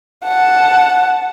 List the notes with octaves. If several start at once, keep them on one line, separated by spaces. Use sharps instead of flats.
F#5 A5